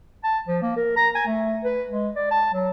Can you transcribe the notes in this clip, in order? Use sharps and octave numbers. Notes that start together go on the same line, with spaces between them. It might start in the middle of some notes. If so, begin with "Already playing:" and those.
A5
F3
A#3
A#4
A#5
G#5
A3
B4
G#3
D5
A5
F#3